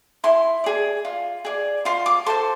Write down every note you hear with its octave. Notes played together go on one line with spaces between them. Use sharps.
E4 C6
G#4 D5
F4
G#4 D5
F4 C6
D6
A4 C5 C6